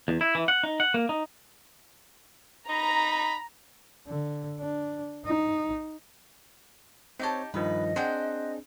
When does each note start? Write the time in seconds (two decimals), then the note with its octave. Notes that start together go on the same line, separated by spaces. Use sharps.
0.08 E2
0.21 E4
0.35 E3
0.48 F#5
0.63 D#4
0.80 F#5
0.94 A#3
1.09 D#4
2.69 D#4 A#5 B5
4.08 D3
4.60 D4
5.26 D#4
7.20 C4 D#4 G4 C#5 A5
7.54 G2 D#3 F3 B4 D#5
7.96 C4 D4 G#4 C5 F#5 G5